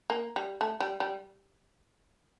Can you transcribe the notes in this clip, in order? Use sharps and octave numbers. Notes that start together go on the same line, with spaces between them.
A#3
G3
A3
G3
G3